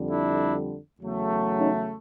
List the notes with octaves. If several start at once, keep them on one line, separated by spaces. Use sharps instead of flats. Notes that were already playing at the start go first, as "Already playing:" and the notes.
Already playing: F2 D3 G3
D4 E4
E2 C#3 F#3 A3
C#4 D#4